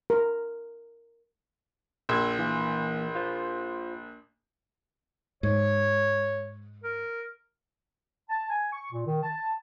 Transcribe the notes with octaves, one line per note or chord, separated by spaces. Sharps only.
A#4
A#1 E6 G#6
E3 A#3
F4 C5
G#2 C#5
A#4
A5
G#5
C#6
A#2
D#3
A5